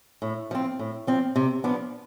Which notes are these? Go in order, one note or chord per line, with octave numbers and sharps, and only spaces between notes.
A2
F3 C4
A2
F3 C4
C3
F3 B3 D4